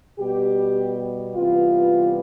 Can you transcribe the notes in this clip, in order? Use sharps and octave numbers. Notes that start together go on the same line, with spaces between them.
B2 G3 B3 G4
C3 E3 G3 B3 F4